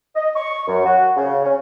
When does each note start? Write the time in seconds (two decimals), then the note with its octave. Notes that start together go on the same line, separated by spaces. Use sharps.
0.15 D#5
0.36 C#6
0.68 F#2
0.85 F#4
1.17 C#3
1.44 C#4